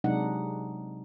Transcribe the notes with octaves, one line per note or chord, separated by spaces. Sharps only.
C3 F#3 G#3 D4 D#4 F#5